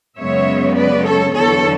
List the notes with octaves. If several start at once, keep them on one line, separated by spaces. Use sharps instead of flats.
F#2 C#3 G#3 B3 C#5 E5
B4 D5
A4 C#5
E2 D3 F#3 A4 C#5